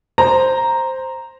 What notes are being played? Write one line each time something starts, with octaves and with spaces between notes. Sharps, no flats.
C5 A#5